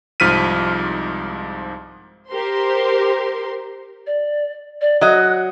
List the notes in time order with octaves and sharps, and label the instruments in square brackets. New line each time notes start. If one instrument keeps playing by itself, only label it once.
[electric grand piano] C2 G#2 F3 F6 B6 D#7
[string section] G4 A#4 C5 C6
[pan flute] D5
D5
[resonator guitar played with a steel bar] F#3 D#5 [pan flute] F#6